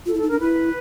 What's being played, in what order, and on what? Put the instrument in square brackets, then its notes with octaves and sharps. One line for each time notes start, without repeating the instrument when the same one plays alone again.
[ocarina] F4 [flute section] A4
[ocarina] E4
[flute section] A4
[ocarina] D#4
[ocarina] D4 [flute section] A#4
[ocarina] E4 [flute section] B4